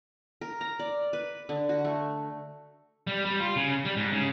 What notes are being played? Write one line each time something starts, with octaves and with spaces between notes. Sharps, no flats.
A#4
A#5
D5
B4
D3
F#4
A3
G3
G3
F4
C#3
G3
G#2
C#3